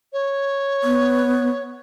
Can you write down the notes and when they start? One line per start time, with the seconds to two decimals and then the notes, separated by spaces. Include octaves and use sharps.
0.13 C#5
0.84 B3